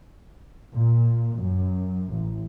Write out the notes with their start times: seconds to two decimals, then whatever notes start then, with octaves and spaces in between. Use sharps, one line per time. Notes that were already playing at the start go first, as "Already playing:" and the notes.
0.73 A#2
1.36 F#2
2.12 A1